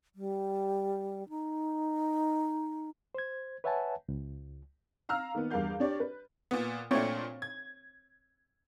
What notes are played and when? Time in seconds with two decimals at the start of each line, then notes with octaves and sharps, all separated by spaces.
0.15 G3
1.29 D#4
3.15 C5 G#6
3.64 B4 C#5 E5 F#5 G#5 A5
4.09 C#2
5.09 F5 A#5 E6 F6
5.35 D#3 A#3 B3
5.50 E2 G2 G3 A#4 F5 G6
5.80 D4 G4 C#5 D5
6.00 B4
6.51 A#2 B3
6.91 A#2 A3 C4 D4 C#5
7.42 G#6